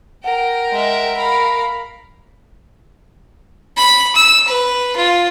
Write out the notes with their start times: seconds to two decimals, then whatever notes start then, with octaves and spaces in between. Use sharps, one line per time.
0.24 A#4 F#5 G5
0.71 G#3 E5
1.17 A#4 F5 B5
3.77 B5
4.15 E6
4.48 B4
4.96 F4